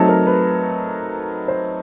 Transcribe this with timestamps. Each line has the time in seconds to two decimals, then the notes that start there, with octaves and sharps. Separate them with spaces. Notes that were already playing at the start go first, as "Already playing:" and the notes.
Already playing: F#3 A3 C4 D#4 A4
0.09 A#4
0.27 B4
1.48 C5